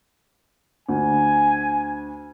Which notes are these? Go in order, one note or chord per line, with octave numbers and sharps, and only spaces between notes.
D2 G#5